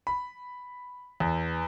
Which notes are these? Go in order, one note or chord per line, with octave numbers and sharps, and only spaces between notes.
B5
E2